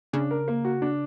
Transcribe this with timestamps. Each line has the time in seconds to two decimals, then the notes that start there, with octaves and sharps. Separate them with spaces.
0.13 C#3 D4
0.31 A#4
0.48 A#3
0.65 F#4
0.82 D4